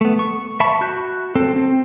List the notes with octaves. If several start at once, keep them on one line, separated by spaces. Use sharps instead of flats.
A3 B3
C#6
E5 A5 B5 C#6
F#4 F#6 G6
C4 A4
C4